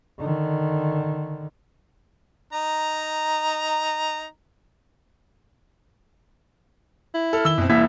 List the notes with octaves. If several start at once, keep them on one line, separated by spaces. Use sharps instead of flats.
D3 D#3
D#4 A#5
E4
A4 F6
D#3 E6 G7
F#2 B2 C4
E1 C2 A#3 E4 E5